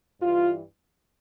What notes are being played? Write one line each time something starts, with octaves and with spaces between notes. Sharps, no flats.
G2 E3 F4